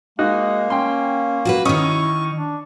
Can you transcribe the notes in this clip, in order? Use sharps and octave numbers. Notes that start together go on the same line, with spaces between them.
G#3 A#3 D#4 F#4
C#4 G5 C6
F#4 G#4 B4
D#3 C#4 D#4 E4 C#6 D#6
D4